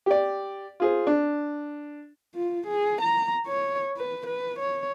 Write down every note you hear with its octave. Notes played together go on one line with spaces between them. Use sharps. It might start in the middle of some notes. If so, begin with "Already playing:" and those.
G4 D5
F4 G#4 C5
D4
F4
G#4
A#5
C#5
B4
B4
C#5